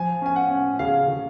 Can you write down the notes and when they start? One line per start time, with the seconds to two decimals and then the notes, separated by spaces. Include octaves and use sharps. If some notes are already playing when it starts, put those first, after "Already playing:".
Already playing: F3 G#5
0.22 C#4 G#5
0.36 F#5
0.50 C#4
0.79 C#3 F5
1.08 C#3